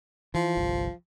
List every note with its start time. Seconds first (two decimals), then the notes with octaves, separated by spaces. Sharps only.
0.34 E3 F3
0.57 G1 C2